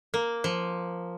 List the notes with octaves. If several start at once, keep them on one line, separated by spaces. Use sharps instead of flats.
A#3
F3